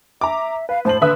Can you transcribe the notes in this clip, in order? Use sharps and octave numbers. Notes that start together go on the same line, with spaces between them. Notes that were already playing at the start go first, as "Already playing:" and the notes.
E5 A#5 D6
B4 F5
A2 C5 A5 F#7
D3 B4 E5 D#6